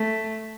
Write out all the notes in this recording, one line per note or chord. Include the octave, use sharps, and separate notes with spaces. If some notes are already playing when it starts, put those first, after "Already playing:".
Already playing: A3